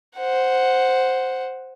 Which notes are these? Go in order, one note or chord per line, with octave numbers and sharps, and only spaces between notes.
C5 F#5